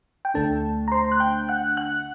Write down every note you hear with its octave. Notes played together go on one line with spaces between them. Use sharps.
G5
D2 D3 A3 D4 A4 A5
A#5
C5 C6
F#6
G5 G6
F#5 F#6
F#5 F#6